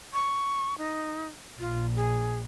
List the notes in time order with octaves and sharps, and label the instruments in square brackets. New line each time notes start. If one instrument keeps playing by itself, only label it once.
[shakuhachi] C#6
D#4
[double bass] A#1 [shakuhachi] F4
[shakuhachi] G#4